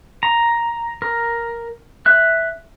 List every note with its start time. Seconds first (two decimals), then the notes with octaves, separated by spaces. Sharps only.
0.23 A#5
1.02 A#4
2.06 E5 F#6